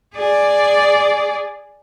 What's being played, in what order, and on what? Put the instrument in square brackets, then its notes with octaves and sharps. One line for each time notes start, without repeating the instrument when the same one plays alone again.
[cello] G#4 D5